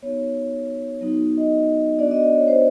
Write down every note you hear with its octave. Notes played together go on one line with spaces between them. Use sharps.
B3 D#4 F#4 C#5
F#3 B3 D#4 F#4
D#5
B3 D4 F#4 D5
D#5
D5
C#5
C5